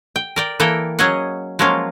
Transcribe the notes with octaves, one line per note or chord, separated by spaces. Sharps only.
G5
A#4 D5 G5
E3 A#3 A4 A#4 G5
F#3 C#4 G#4 C#5 D#5 F#5
F3 F#3 G#3 A#3 C#4 F4